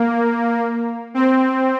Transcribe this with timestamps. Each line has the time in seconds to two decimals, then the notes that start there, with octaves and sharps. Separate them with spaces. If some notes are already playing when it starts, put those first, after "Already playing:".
Already playing: A#3
1.14 C4